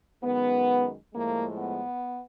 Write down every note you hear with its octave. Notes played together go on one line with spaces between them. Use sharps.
F#2 D#3 G#3 B3
A2 F3 G#3 A#3
B3